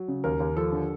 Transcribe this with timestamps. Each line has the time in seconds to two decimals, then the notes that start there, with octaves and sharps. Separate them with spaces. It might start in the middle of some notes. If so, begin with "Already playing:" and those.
Already playing: F#3
0.08 C#3
0.24 D#2 A#4
0.40 D#2
0.56 F3 A4
0.72 D3